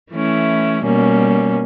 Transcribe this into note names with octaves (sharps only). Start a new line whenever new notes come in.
E3 A3 C#4 E4
B2 G3 A#3 C#4